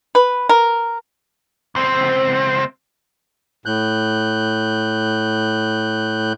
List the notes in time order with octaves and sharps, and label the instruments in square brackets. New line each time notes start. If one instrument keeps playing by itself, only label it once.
[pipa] B4
A#4
[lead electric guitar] C#2 C4
[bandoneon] A2 F#6 G6